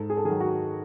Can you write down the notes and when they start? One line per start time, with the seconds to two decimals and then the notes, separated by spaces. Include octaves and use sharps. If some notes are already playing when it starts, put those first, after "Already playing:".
Already playing: G#2 A4
0.10 G#4
0.17 A4
0.25 D#3 F#3 G#4
0.40 F#4